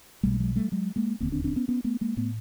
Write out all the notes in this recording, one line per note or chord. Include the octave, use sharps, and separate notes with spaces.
B1 B2 G3 A3
A3
F#3 G#3
G3 A3
F#3 G#3
G#3 A#3
E1 D#2 D3 A#3 C4
C4 D4
C4 D4
B3 C#4
B3 C#4
A3 B3
G#3 A#3
A2 A3 B3